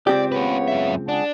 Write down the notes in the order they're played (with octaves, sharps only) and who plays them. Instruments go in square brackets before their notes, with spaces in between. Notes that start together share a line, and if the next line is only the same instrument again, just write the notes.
[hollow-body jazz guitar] C#2 C4 G4 [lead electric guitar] D5
[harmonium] C#3 B3 C#5 [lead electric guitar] G#4 B4
[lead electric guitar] F#2 E5
[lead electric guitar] D4 [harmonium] G#4 F#5 A5